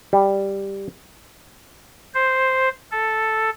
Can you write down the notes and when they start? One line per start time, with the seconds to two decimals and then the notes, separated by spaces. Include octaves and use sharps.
0.13 G3
2.14 C5
2.92 A4